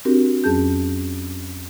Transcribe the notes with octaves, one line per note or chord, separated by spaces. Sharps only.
C4 D4 F#4 G4 A#4
F2 F#3 C#4 G#4 A5 G6